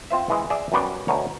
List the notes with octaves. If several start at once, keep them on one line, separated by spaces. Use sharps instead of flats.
C4 F4 C5 E5
E3 G#3
G#4 D5 E5
F#2 G3 B3 F#4 B4 D5
D2 B2 A#4 C#5